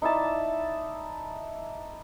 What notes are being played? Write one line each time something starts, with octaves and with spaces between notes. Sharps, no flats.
D#4 E4 D5 A5